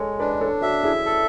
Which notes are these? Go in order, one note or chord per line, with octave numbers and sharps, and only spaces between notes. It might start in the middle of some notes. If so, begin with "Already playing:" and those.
Already playing: G#3 A4 C#5
D4 B4 D5
D5
A4 C#5
F#4 A4 E5
E4 G#4
A4